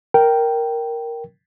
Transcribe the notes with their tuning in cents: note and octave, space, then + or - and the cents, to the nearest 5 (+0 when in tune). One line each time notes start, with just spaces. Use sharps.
A#4 +0 G5 -10